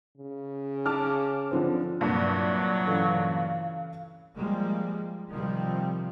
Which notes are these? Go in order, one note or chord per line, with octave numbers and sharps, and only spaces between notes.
C#3
A5 D6 F6
D3 F3 C4
C2 G2 A#2 F#3
C#3 E3 A4 F5
F3 G3 G#3 A#3
C3 D#3 F3 G3 C4